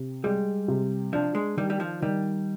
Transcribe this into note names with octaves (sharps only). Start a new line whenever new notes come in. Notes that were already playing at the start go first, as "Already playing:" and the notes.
Already playing: C3
G3 G#3
C3
F3 D4
G#3
D#3 G3
G3
F3
D#3 G3